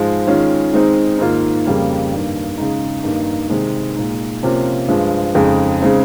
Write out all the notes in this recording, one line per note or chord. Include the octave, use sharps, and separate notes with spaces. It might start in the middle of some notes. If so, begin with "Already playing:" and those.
Already playing: G#2 F3 G#3
D#3 G#3 C#4 F4
D#3 G#3 C4 D#4
G#2 D#3 A#3 F4
F2 C#3 G3 A#3
G2 D#3 A#3
C#3 G#3 D#4
G2 D#3 A#3 D#4
C3 D#3 G#3
A#2 G#3 D#4
C3 F3 A#3 C#4 F4
G2 F3 G#3
F2 C#3 G#3 D#4
C#3 G#3 C4 D#4